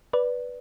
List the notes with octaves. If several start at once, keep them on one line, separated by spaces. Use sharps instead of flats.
B4 D5